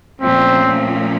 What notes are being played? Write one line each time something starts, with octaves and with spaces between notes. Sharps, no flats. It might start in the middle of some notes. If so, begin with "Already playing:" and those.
A#2 F3 A3 C4 C#4